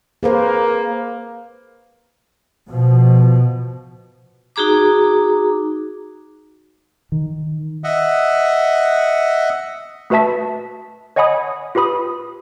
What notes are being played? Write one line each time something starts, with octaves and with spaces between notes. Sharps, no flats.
A#3 G#4 B4 C5
B2 F3
D#4 F#4 G#4 A#5 D6
D#3
D#5 E5 F#5
A3 F#4 B4 E5 A5 B6
C#5 D#5 F#5 G#5 B5 D#6
F4 G4 B4 B5 D#6